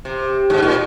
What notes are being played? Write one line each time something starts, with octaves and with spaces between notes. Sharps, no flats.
C3
G#2
A#2